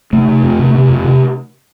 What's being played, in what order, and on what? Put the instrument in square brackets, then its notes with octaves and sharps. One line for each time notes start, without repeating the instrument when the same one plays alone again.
[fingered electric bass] C3 A3
C3
F2
C3
C3
F2
C3